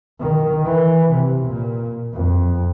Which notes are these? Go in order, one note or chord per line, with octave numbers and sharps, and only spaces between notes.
D#3
E3
C3
A#2
F2